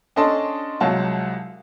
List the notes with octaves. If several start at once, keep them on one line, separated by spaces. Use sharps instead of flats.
C#4 D4 A4 D#5 A5 C6
C2 F#3 G#3 F4 A5